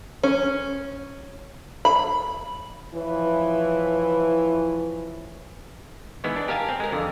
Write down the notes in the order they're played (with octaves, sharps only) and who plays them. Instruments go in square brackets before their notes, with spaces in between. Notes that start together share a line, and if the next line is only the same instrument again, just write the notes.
[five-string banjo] C#4
B5
[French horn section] E3 F3 E4 B4 C#5
[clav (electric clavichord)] D#3 E3 G#3 B3
D4
G4 A#4 F5 G#5 A5
C4
G#3 A#4
F2 D3